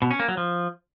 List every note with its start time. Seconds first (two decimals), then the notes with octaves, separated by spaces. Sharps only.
0.02 B2
0.11 C#4
0.20 A#3
0.28 F#3
0.37 F3